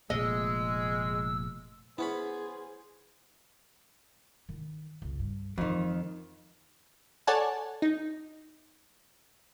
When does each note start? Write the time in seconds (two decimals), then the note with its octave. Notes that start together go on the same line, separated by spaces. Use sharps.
0.10 F1 A#2 G#3 A3 D#5 E6
1.98 B3 C#4 E4 G#4 C5 B5
4.49 D#3 E4
5.02 F#1 C#2
5.19 G2
5.58 F2 D#3 E3 G#3
7.27 A4 C#5 D5 F#5 G#5 A5
7.82 D#4